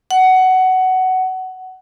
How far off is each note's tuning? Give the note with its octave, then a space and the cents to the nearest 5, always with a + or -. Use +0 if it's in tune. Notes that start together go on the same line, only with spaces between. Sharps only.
F#5 +15